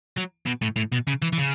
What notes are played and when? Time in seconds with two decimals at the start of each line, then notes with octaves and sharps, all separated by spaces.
0.17 F#3
0.46 B2
0.62 A2
0.76 A2
0.92 B2
1.07 C#3
1.22 E3
1.33 E3
1.38 C#3